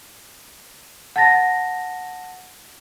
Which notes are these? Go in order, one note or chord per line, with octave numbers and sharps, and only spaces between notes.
F#5 A5 A6 A#6